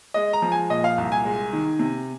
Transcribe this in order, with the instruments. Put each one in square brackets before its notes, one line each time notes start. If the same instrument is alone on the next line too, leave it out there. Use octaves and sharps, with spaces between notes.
[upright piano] G#3 D#5
A#5
F3
G#5
A#2 D#5
F5
C2
G#5
G#3
D#3
C3